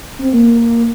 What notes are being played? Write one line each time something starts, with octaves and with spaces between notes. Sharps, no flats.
C4
A#3